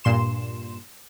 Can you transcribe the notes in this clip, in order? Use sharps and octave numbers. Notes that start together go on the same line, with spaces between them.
G2 A#2 C6 E7